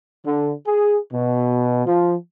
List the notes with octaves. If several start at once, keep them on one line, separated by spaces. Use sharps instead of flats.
D3
G#4
B2
F3